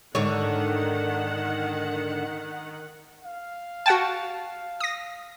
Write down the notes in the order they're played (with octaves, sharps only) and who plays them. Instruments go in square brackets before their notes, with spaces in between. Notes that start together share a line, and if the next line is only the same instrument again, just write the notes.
[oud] G#2 D3 C#5 [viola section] D#3 F#5
[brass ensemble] F5
[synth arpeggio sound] F#4 F#5 G5 [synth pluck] A5
[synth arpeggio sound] D#6 A#6